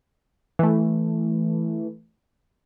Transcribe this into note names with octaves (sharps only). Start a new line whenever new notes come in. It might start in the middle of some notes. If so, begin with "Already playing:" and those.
E3 A3